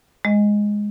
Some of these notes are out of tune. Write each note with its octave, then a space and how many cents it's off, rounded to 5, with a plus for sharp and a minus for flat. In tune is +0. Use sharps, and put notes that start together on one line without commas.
G#3 +0 D#5 +0